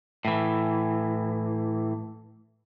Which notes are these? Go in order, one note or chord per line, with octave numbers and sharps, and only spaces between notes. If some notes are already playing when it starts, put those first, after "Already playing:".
A2 E3